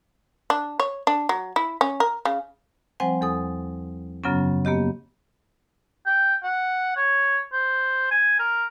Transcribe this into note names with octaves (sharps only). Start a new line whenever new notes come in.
D4
C#5
D4
F#3
E4
C#4
A#4
C#3
F3 G3 C4 C5 F#5 G#5
E2 A4 D#6
F#2 C#3 F#3 B3 C#4
A#3 B3 G4 D#5
G5
F#5
C#5
C5
G#5
A#4